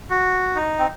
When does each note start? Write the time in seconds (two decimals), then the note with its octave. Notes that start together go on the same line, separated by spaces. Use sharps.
0.10 F#4
0.55 D#4
0.79 C4